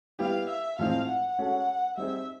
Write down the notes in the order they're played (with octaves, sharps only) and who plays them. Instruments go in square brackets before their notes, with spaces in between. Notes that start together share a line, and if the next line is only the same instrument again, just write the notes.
[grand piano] G3 B3 E4 G4 [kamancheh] F5
[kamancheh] E5
[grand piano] A2 F3 G#3 C4 D#4 [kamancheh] F5
[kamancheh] F#5
[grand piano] G#3 C#4 F#4 A4
[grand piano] G3 C4 D#4 G#4 [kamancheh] E5